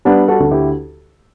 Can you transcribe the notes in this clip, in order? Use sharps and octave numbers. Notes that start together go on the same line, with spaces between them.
G3 B3 D4
F#4 A4
D2
E4 G4